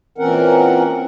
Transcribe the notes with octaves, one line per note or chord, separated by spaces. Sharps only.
A#2 E3 C4 C#4 A#4 F#5